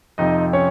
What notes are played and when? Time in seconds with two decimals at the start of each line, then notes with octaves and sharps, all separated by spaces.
0.18 F2 C3 F3 D#4 D#5
0.53 C#4 C#5